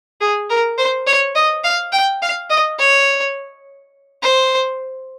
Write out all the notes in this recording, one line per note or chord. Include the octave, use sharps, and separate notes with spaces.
G#4
A#4
C5
C#5
D#5
F5
G5
F5
D#5
C#5
C5